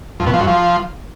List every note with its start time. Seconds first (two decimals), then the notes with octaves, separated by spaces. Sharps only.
0.20 F2
0.27 B2
0.34 F3
0.40 F#2
0.47 F3